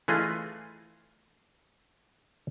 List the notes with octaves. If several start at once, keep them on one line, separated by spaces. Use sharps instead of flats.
E3 A3 F4 G#4 D#5